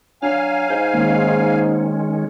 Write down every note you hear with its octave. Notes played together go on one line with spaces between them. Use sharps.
F#3 D4 F5 G#5 F6
G#2 G6
D#3 G#3 A#3 C#4